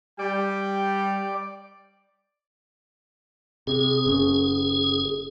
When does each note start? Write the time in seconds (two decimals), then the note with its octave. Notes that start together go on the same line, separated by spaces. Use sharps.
0.19 G3 D5 G5
3.67 C3 G#4
4.06 F#1 C#3